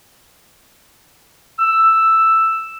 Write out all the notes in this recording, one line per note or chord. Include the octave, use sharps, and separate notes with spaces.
E6